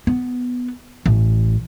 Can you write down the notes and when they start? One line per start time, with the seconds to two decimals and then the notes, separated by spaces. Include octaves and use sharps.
0.07 B3
1.06 A1